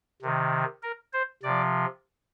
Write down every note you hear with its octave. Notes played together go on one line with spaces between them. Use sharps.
C3 D#3
A#4
C5
C3 F3 D5